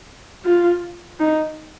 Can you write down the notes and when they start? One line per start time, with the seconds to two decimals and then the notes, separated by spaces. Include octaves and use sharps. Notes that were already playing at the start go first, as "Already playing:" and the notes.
0.45 F4
1.20 D#4